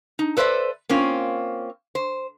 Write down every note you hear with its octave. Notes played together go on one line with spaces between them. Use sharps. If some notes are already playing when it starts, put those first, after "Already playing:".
D#4
A4 B4 C5 D5 E5
A#3 C4 C#4 F4
C5